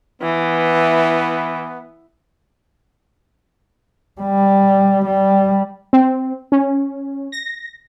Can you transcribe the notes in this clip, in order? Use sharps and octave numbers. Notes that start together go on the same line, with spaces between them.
E3 B3
G3
G3
C4
C#4
A#6